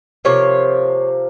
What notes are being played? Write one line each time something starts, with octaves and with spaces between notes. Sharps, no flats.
C3 F3 A#3 C#5